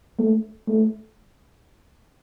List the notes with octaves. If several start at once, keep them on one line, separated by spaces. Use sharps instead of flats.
A3
A3